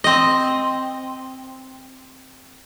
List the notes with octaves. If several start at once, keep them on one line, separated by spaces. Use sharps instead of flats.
C4 D#5